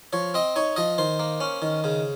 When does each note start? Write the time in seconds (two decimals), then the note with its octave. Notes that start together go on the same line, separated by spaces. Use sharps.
0.13 F3 C#5
0.34 C4 D#5
0.56 D#4 C#5
0.76 F3 D#5
0.98 D#3 C5
1.19 A#3
1.40 C#4
1.62 D#3
1.84 C#3